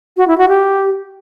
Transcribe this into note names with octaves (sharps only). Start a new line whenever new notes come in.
F#4
E4
F#4
G4